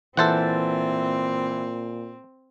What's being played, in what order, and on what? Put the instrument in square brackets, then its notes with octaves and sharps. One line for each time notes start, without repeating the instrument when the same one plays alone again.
[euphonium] A#2 [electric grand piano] E3 E5 A6 [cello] C4 [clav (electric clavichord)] A4 C5 F#5